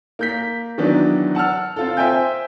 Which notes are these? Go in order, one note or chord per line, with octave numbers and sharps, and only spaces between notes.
A#3 G6 B6
D#3 E3 F#3 B3 D4
F#5 A5 E6 F6
C4 F4 A4
C5 E5 G5 G#5 G6